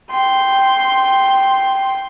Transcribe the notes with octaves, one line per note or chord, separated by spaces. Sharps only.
G5 C6